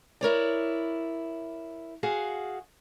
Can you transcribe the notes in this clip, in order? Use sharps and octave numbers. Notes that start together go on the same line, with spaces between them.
E4 A#4 C#5 D5
F#4 G#4 F5 F#5